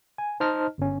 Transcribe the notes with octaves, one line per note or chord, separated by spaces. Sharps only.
G#5
D#4 C5 D#5 A5 F6
G1 C#4